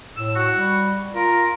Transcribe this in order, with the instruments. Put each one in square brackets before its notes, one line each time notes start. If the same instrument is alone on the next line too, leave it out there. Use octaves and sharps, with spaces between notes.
[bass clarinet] A2 [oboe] E6
[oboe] F#4
[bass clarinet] G3
[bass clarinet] F4 [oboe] A#4